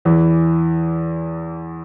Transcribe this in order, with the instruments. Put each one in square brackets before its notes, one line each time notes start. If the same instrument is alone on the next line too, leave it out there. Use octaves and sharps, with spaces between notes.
[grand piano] E2 E3